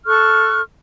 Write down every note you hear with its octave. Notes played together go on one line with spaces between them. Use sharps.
A4 C#6 F6 F#6